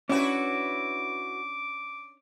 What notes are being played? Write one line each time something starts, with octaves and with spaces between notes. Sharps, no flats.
C#4 D4 E4 F#4 B4 D6